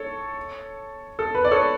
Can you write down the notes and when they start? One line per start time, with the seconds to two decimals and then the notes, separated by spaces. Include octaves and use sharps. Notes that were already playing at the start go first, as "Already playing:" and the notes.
Already playing: A4 C#5
1.19 A4
1.35 B4
1.45 D5
1.51 A4 C#5